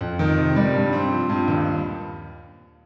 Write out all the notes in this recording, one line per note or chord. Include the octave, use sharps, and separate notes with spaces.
F2
D#3
C3
G3
G2
C4
F3
G2
D#2